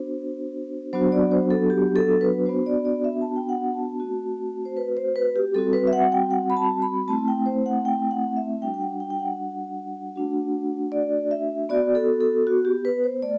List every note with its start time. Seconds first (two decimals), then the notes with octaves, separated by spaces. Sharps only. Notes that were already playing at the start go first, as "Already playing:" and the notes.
Already playing: B3 D4 F#4 C5
0.93 F#3 B3 D4 F#4 C5
1.12 D5
1.31 C5
1.50 A4
1.70 G4
1.96 A4
2.21 B4
2.46 B3 D4 F#4 C5
2.66 D5
2.85 D5
3.04 E5
3.22 A5
3.36 G5
3.49 F#5
3.74 A5
4.00 A3 C4 F#4
4.65 C5
4.77 B4
4.97 C5
5.16 B4
5.36 G4
5.54 G3 C4 F#4 A4
5.73 B4
5.87 E5
5.93 F#5
6.12 G5
6.31 F#5
6.50 B5
6.57 A5
6.82 B5
7.08 A3 C4 E4 A5
7.28 G5
7.46 C5
7.66 F#5
7.85 G5
8.11 F#5
8.36 E5
8.61 G3 D4 F#4 G5
8.74 G5
8.80 F#5
9.00 G5
9.10 G5
9.20 F#5
10.16 A3 D4 F#4
10.92 D5
11.31 E5
11.69 B3 F#4 D5
11.95 A4
12.21 A4
12.47 F#4
12.65 G4
12.85 B4
13.04 C5
13.22 A3 D5